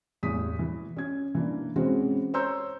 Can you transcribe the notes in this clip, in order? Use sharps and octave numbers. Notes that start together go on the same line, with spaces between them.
A1 E2 D#6 B6
E3
C#4 G#6
E3 A#3 D4
E3 G#3 C4 C#4 F#4
C5 C#5 A#5 C6 E6 G6